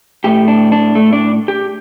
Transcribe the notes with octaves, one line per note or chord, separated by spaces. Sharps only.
A2 A3 G4
D4
D4
A3
D4
G4